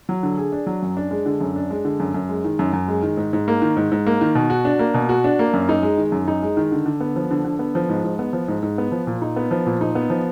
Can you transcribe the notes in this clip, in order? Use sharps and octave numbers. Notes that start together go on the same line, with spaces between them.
F#3
D3
G#4
D4
F#3
F#2
D4
G#3
D3
F#2
D4
G#3
D3
F#2
F#2
G#3
D#3
F#2
F#2
G#3
D#3
G#2
G#2
A#3
D#3
G#2
G#2
A#3
D#3
B2
F#4
D4
A#3
B2
F#4
D4
A#3
F#2
D#4
G#3
D#3
F#2
D#4
G#3
D#3
D3
D3
B3
F3
D3
D3
B3
F3
G#2
G#2
B3
F3
G#2
G#2
B3
F3
A#2
D#4
B3
F3
A#2
D#4
B3
F3